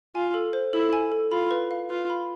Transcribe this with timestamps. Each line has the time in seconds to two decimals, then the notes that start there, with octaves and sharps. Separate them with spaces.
0.15 F4 G#5
0.34 A4
0.53 C5
0.73 E4 A4
0.93 G#5
1.12 A4
1.32 F4 B5
1.51 B4
1.71 F5
1.90 F4 B4
2.10 B5